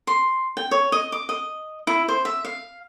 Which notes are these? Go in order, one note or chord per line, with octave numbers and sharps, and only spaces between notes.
C6
G5
C#5
D#5
D6
D#5
E4
C5
E5
F5